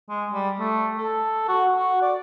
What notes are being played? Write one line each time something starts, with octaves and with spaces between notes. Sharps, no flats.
G#3
G3
A3
A4
F#4
F#4
D5